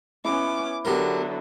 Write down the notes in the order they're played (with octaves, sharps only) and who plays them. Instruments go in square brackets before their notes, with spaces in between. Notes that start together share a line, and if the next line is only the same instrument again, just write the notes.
[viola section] B3 C#4 [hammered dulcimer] E4 [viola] D6
[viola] D3 F#3 [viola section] B3 [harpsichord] G4 A#4